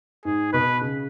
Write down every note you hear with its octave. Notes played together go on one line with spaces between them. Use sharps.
G#2 G#4
B2 B4
C#3